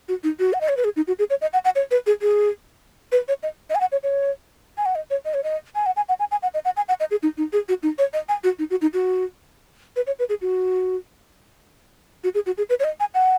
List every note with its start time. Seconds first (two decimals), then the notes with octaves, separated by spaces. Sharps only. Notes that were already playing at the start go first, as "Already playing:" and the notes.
0.09 F#4
0.24 D#4
0.39 F#4
0.53 F#5
0.61 D#5
0.69 C#5
0.77 B4
0.84 G#4
0.96 D#4
1.08 F#4
1.19 G#4
1.30 C#5
1.42 D#5
1.53 F#5
1.65 F#5
1.76 C#5
1.91 B4
2.07 G#4
2.22 G#4
3.12 B4
3.28 C#5
3.43 D#5
3.70 D#5
3.75 G#5
3.81 F#5
3.92 C#5
4.03 C#5
4.78 G#5
4.86 F#5
4.95 D#5
5.10 C#5
5.25 D#5
5.34 C#5
5.44 D#5
5.75 G#5
5.86 F#5
5.97 G#5
6.09 F#5
6.20 G#5
6.31 G#5
6.43 F#5
6.54 D#5
6.65 F#5
6.77 G#5
6.89 F#5
7.00 D#5
7.11 G#4
7.23 D#4
7.38 D#4
7.53 G#4
7.69 F#4
7.83 D#4
7.98 C#5
8.13 D#5
8.29 G#5
8.44 F#4
8.59 D#4
8.70 F#4
8.82 D#4
8.93 F#4
9.96 B4
10.07 C#5
10.19 B4
10.29 G#4
10.42 F#4
12.24 F#4
12.35 G#4
12.46 F#4
12.58 G#4
12.69 B4
12.80 C#5
12.84 D#5
13.00 G#5
13.14 F#5